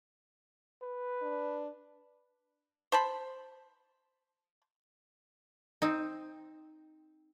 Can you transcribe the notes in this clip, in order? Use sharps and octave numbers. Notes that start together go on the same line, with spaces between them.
B4
D4
C5 A5 B5
C4 D#4